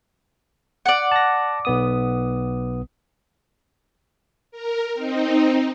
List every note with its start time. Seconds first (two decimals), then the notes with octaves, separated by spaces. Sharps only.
0.86 D5 F#5
1.12 A5 A#6
1.65 B1 B3 D#6
4.51 A#4
4.94 C4 D#4